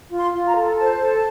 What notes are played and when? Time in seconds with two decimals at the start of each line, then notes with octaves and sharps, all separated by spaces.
0.10 F4
0.18 C6
0.32 F4
0.47 A#5
0.55 A4
0.77 C5 A5
0.99 A4